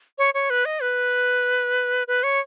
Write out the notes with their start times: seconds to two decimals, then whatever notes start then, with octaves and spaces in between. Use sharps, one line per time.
0.18 C#5
0.34 C#5
0.50 B4
0.65 D#5
0.82 B4
2.07 B4
2.23 C#5